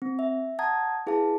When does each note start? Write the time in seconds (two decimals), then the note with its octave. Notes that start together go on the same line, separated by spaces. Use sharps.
0.02 C4
0.19 E5
0.59 F#5 A5 A#5 D#6 G#6
1.07 E4 G#4 B4 F5 A5